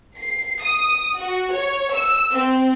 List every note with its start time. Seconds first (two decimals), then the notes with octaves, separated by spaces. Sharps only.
0.17 C7
0.62 D#6
1.18 F#4
1.53 C#5
1.93 E6
2.32 C4